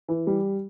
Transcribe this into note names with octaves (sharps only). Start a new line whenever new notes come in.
E3
G3